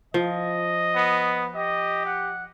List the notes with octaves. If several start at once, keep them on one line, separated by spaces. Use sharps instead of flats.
F3 D#5
B3
G4 D#5
F#5